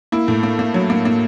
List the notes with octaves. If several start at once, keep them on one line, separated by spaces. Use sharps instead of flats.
A#3 E4
A2
A#3
A#3
F#3
A#3
A#3